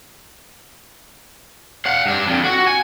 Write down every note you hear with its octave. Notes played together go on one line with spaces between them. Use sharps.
F5 F#5
G2 D4
F2 D3
F#4 F#5
G#5